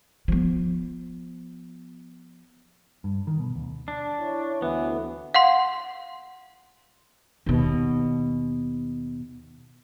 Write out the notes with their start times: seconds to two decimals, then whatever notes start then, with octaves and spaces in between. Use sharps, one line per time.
0.28 F3 B3
3.04 G2
3.27 D#3
3.39 B2
3.56 D2
3.88 D4
4.19 E4 C#5
4.62 D2 E3 B3
5.34 F5 F#5 C6
7.46 D#2 B2